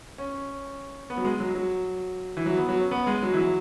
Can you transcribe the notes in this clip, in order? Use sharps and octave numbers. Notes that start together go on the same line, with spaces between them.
C#4
B3
F#3
G#3
F#3
F#3
E3
F#3
B3
F#3
C#4
B3
G#3
F#3
E3
F#3